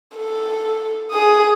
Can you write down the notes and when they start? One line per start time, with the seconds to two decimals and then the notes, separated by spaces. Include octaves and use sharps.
0.17 A4
1.11 G#4 D#6